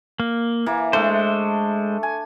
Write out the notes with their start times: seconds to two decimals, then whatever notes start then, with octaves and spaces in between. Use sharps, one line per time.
0.20 A#3
0.66 E3 A#3
0.93 G#3 A3 D4 C5
2.03 G#5